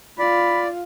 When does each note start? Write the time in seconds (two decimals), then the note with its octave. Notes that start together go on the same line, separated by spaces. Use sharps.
0.19 F4 D5 B5